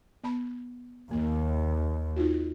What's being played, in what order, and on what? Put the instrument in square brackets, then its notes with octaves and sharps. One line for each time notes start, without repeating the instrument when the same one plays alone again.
[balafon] B3 A5 B5
[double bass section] D#2 [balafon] A#3
[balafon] D#4 F4 F#4